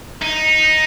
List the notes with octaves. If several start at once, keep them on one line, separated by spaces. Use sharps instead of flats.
D#4